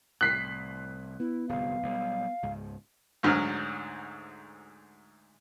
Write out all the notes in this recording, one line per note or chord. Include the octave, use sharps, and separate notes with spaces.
C2 A2 F#6 B6 C7
B3 E4
D1 C2 F5
B1 G3
C#2 G#2
D2 G#2 F#3 F6